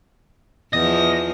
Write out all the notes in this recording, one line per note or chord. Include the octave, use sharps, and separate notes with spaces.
E2 F3 D#5